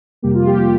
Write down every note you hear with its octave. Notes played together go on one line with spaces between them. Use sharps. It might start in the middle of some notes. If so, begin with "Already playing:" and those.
F2 C3 G3 A#3 G4
F4
G4
G4